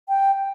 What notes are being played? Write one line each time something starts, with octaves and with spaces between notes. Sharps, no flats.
G5